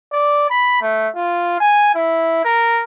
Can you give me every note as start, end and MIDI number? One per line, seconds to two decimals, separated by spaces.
0.13 0.49 74
0.50 0.77 83
0.82 1.08 57
1.16 1.56 65
1.60 1.91 80
1.95 2.44 64
2.45 2.84 70